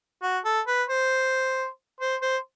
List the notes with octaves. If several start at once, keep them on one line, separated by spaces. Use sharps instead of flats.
F#4
A4
B4
C5
C5
C5